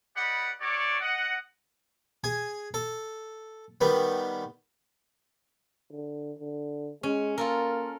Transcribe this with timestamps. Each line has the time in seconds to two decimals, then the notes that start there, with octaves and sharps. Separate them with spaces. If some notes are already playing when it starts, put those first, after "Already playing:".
0.16 G4 B4 D5 D#5 F#5 B5
0.60 D4 F#4 A4 C#5 D5
1.01 D#5 F#5
2.24 G#4 G#5
2.74 A4
3.81 D#3 G3 B3
5.91 D3
6.39 D3
7.03 G#3 C#4
7.38 A#3 F4 A4 A#4